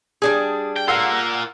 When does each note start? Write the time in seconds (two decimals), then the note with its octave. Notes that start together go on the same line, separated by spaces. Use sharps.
0.22 G3 D4 G#4 D#6
0.76 G5
0.88 F4 A#4 F#5 E6 C7